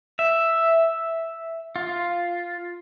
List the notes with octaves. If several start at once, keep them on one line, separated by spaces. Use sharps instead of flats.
E5
F4